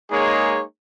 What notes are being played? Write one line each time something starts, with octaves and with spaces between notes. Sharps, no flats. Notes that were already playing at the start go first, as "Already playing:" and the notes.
G#3 A#3 D#4 G#4 C#5